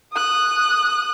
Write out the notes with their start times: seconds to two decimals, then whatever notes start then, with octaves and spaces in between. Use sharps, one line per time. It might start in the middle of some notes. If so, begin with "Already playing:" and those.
0.13 D#6 F#6